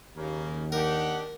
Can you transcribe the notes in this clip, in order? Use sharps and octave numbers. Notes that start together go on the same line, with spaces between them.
D#2 C#3 A#3
D4 D#4 G4 A#4 F#5